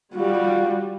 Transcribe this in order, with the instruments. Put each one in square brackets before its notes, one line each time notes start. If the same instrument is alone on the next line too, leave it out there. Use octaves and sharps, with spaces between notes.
[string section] G3 [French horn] F4 [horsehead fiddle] F#4